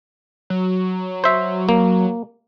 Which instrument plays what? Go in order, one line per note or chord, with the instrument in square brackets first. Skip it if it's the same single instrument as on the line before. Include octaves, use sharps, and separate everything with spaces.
[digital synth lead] F#3
[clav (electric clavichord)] C5 E5
A#3